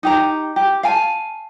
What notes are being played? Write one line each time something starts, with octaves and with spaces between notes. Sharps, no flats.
D#4 G4 A#5
G4
F5 G#5 A5